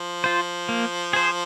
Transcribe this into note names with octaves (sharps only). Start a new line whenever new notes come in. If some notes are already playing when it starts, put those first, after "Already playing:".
Already playing: F3
F4 C5
A#3
G#4 C5